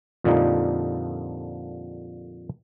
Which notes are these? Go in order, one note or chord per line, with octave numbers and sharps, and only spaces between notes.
F2 A#2 D3 F3 G3 D#4